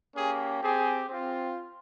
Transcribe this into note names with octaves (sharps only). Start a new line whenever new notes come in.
A#3 C#4 G4 G#4
C4 G4 G#4
C4 F4